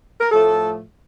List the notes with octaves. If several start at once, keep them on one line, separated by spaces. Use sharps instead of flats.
A#4
A2 F3 A3 A4